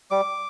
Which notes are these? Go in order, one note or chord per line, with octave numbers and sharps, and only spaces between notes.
G3 D6